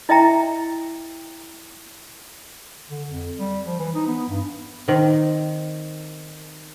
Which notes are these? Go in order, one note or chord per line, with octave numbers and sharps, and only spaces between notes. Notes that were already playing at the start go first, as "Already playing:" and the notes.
E4 D#5 E5 G5 A#5
D3
F2
G3
F3
E3
D#4
B3
G2
D#3 C4